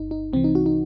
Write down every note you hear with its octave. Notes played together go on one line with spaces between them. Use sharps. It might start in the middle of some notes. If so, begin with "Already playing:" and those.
Already playing: G1 G2 D#4
D#4
C2 C3 E3 C4
D#4
F#4
D#4